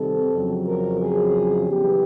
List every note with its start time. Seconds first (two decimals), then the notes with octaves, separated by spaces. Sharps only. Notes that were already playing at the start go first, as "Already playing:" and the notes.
Already playing: C3 D#3 G3 C4 A4
0.33 F2 C#3 F#3
0.68 A#4
1.01 G#4
1.69 C#3 E3 G3 B3 G4